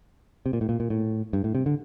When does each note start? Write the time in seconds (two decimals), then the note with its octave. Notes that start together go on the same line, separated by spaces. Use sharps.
0.46 C3
0.53 A#2
0.61 A2
0.69 A#2
0.80 A#2
0.90 A2
1.33 G2
1.44 A2
1.55 C3
1.66 D3